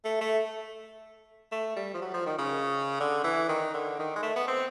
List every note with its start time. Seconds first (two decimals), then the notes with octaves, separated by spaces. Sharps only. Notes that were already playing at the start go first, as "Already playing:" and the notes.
0.04 A3
0.21 A3
1.52 A3
1.76 G3
1.94 F3
2.02 F#3
2.14 F3
2.26 D#3
2.38 C#3
3.00 D3
3.24 E3
3.49 D#3
3.74 D3
3.99 D#3
4.16 G#3
4.23 A3
4.36 B3
4.48 C4